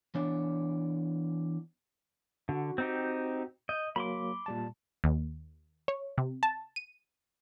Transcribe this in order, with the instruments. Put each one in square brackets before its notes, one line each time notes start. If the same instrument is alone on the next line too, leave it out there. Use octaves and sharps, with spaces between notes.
[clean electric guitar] E3 B3 D4 C#5 D5
[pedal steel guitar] D3 [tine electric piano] F#4
[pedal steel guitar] C4 D#4 G4
[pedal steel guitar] D#5 [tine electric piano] G6
[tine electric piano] F#3 A#3 [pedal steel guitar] B5 C6 D6
[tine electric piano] A#2 G3 A5
[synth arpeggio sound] D#2
C#5
C3
A5
D#7